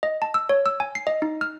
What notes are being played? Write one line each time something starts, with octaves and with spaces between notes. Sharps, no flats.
D#5
A5
E6
C#5
E6
G#5
C7
D#5
D#4
F6